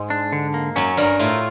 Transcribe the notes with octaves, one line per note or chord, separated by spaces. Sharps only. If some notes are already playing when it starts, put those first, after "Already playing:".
Already playing: G#2 G#3
D4
D3
A#3
F#2 F#3 C#4
G2 G3 A#4
A2 A3 F4